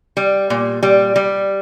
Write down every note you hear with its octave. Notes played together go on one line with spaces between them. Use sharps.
G3
A#2
G3
G3